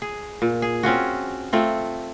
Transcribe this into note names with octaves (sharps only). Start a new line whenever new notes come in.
G#4
A#2
G#4
C4 C#4 F4 F#4
A3 C4 F4